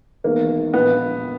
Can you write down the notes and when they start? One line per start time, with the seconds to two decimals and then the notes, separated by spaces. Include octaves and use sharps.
0.24 E1 E2 D#3 A#3
0.74 A#1 A#2 B3